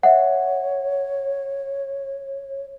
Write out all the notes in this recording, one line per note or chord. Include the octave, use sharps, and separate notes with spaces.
C#5 E5 F#5